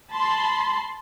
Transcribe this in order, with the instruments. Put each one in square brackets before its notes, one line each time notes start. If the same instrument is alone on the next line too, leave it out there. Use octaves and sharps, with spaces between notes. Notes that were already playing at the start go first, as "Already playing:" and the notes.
[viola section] A5 B5 C6